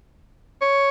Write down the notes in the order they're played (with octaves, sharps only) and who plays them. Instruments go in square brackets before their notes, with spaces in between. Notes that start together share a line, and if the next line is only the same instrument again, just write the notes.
[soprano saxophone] C#5